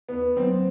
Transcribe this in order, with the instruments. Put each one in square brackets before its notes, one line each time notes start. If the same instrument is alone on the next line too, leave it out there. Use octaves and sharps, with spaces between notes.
[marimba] D#2 [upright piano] B3
[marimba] D#3 F#3 A#3 [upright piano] C4